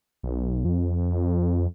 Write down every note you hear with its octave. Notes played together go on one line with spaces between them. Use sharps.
B1
F2